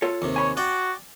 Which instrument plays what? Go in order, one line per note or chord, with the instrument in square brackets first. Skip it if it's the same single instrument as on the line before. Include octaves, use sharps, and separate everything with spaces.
[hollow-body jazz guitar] F4 A4 C#5
[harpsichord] D#2 C3
[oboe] C#5 [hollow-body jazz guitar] G#5 B5
[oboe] F#4 [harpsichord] D5 G5